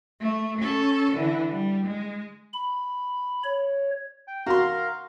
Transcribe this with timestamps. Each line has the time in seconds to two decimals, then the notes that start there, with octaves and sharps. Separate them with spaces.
0.20 A3
0.60 C#4 A4
1.14 D3 E3
1.53 G3
1.86 G#3
2.53 B5
3.44 C#5
4.28 G5
4.46 F#4 A#4 F5 A#5 C6